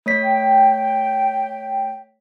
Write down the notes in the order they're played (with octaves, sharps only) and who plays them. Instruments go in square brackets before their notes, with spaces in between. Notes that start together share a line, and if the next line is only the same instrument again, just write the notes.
[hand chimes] A3 C#5 B6
[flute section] G5